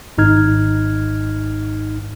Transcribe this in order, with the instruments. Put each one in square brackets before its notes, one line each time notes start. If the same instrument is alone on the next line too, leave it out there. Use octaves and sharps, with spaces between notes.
[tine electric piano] G#1 G#2 D#4 F6 G#6